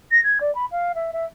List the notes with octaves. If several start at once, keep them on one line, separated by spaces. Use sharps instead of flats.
A#6
G#6
D5
B5
F5
E5
E5